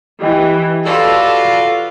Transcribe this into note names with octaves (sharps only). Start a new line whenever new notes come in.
E3 G4 D#5 G5
F4 F#4 A4 B4 D5